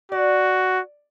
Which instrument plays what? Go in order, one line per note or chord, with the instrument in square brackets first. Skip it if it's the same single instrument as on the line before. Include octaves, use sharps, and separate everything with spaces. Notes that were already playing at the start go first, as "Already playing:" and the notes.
[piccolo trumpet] F#4 [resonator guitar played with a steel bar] D5